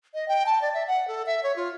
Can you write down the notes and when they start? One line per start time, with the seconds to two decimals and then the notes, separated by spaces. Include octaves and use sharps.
0.14 D#5
0.28 G5
0.46 A5
0.62 D5
0.74 E5
0.88 F#5
1.08 A4
1.26 E5
1.43 C#5
1.56 F4